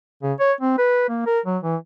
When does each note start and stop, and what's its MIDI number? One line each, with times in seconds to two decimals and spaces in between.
0.23 0.33 49
0.40 0.53 73
0.61 0.75 60
0.78 1.06 71
1.09 1.24 58
1.26 1.40 70
1.46 1.58 54
1.63 1.76 52